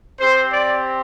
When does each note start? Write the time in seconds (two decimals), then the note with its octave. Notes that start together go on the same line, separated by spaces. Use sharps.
0.19 C4 G4 C5
0.51 D5